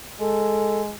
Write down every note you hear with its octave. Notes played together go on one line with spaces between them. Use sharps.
G#3 A4